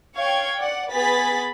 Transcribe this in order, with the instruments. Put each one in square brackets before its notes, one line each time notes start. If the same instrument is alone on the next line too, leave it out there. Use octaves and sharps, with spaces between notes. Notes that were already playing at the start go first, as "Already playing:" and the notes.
[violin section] C#5 F5 G5 C#6 G#6
D5 F#5
B3 G#4 B4 B5 A6 B6